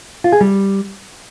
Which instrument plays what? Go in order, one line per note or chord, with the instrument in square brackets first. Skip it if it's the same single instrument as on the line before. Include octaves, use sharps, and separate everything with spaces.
[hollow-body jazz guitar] F4
G#4
G3